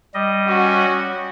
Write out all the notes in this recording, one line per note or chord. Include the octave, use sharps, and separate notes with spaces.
G3 D#5
C#4 F#4